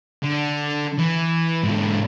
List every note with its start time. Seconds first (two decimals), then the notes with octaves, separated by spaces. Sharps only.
0.23 D3
0.99 E3
1.64 G#2 D3